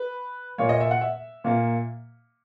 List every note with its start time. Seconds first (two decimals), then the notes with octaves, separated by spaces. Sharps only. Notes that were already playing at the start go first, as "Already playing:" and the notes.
Already playing: B4
0.58 A#2 A#3 C#5
0.69 D#5
0.80 E5
0.91 F#5
1.01 E5
1.44 A#2 A#3